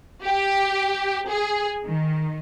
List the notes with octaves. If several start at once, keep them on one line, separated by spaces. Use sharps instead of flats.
G4
G#4
D#3